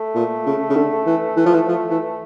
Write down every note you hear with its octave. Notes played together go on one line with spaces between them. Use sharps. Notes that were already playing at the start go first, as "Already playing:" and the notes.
Already playing: A3
A#2
C#3
C#3
D3
E3
E3
F3
E3
F3
E3